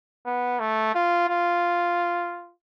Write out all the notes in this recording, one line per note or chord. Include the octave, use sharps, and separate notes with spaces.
B3
A3
F4
F4